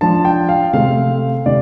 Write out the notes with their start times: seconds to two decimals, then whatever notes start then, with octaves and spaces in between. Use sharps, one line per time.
0.01 F3 D4 A5
0.25 G5
0.49 F5
0.73 C3 A3 C4 F5
1.46 C3 D5